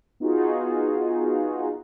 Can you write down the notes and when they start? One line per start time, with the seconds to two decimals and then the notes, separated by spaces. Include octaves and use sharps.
0.20 B3 D#4 F4 F#4 G#4